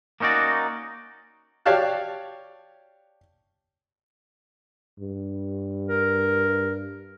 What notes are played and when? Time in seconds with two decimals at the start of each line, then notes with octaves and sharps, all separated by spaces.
0.20 A#3 C#4 D#4 F#4 D5
1.65 G4 C#5 D5 F5 A5 F#6
4.99 G2
5.89 A#4